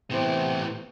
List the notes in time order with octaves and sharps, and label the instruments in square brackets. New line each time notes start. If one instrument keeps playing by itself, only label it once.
[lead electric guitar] A2 E3 [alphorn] C3 [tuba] B3